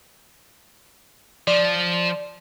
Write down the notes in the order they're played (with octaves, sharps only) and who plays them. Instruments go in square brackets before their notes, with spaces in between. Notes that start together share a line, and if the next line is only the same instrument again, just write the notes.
[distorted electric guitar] F3 [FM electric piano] D5